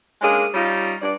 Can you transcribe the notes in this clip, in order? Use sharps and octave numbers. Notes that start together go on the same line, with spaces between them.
G#3 A#3 C#4 D4 G#4
G3 C#4 D#4 F4
G2 D5